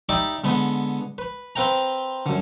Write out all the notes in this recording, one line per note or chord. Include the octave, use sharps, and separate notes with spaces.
D#4 G4 D5 E5 B5 D6
D3 G#3 B3 B4
B4
C4 B4 F5 G5 A#5
F#2 D3